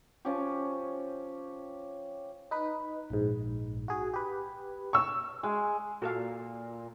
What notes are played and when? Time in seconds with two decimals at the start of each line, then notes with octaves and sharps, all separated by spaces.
0.25 F3 C#4 G4
2.51 D#4 B4
3.10 A#1 G#2
3.88 F#4 G#4
4.14 G4 B4
4.93 C#6 E6
5.43 G#3
6.02 A#2 F#4 A4 F5